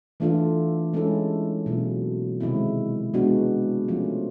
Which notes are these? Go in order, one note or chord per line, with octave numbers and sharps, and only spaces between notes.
E3 A3 D4 F4 A4
G#3 C#4 E4 A4
B2 F#3 A#3 C#4 F4
C3 D#3 G#3 C4 E4
G#3 B3 D4 F#4
F3 A3 C#4 F4